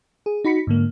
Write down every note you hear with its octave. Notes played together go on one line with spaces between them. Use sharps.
G#4
D#4 F#4 B5 B6 C#7
G#2 D3 A#3